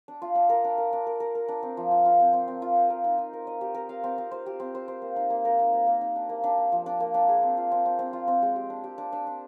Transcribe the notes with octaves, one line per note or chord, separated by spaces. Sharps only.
D4
F4
D4
A#4
D4
A#4
D4
A#4
A#4
A#4
D4
C4
F3
F4
F4
C4
C4
C4
F4
D#5
A#4
D#4
D#4
A#4
D#5
G4
A#4
F5
C4
C4
C5
G4
C4
C5
C5
A#3
D#4
A#3
A#4
D#4
A#3
A#3
D#4
D4
A#3
D4
A#3
F3
D4
A#3
D4
G#4
C4
F4
C4
C4
C4
F4
C4
G#3
G4
D4
G4
D4
D4
D4